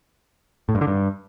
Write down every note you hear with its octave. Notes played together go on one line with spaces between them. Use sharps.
A2
G2
D3
G2